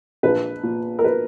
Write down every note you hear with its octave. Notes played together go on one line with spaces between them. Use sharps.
A#1 B4
A#2
A#4
B4